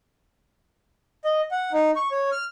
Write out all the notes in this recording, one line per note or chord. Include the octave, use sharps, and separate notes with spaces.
D#5
F#5
D#4
C#6
C#5
F6